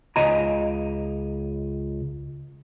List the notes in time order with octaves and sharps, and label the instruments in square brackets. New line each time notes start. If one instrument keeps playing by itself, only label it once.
[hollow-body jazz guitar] C#2 D#5 G#5 A#5